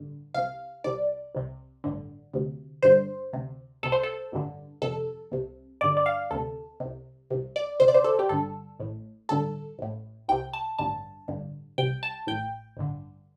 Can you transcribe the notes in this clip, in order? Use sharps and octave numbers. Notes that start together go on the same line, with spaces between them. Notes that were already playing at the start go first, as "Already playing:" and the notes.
Already playing: A1 G2 D3
C2 C3 F5
C2 C3 D5
C2 C3
A1 G2 D3
D2 C3
G1 G2 D3 C5
D2 C3
C2 C3 A4
C5
A4
A1 G2 D3
G1 F2 C3 A4
C2 C3
G1 G2 D3 D5
D5
F5
D2 C3 A4
C2 C3
C2 C3
D5
D2 C3 C5
D5
C5
A4
G4
G1 G2 D3 A4
A1 A2
A1 G2 D3 A4
A1 A2
C2 C3 G5
A5
A1 G2 D3 A5
A1 G2 D3
C2 C3 G5
A5
A1 A2 G5
A1 G2 D3